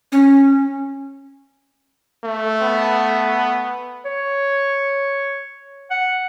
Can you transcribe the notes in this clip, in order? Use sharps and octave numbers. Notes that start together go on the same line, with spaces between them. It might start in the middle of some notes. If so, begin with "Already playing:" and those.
C#4
A3
B3
C#5
F#5